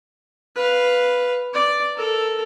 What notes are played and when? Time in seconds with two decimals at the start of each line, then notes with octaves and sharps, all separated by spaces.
0.56 B4 F5
1.54 D5
1.96 A4 A#4